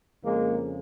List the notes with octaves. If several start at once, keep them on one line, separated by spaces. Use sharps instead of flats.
F2 C#3 F3 G#3 A#3